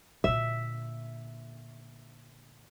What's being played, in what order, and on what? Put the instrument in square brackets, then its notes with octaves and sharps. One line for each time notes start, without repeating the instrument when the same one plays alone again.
[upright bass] A#2 D3 [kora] E5